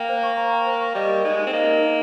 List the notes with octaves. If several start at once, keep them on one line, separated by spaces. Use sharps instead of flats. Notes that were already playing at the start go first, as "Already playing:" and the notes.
Already playing: A#3 G5
C5
C#6
A#5
G5
C5
C#6
G3 D#5
A#4
G#3 D#4
D#4
C4
A#3 D#5
A#4
D#4